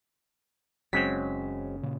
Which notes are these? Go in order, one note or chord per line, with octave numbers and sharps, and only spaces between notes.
F#1 C#3 F#3 G#3 C4 C#4 B6
A#2 C#3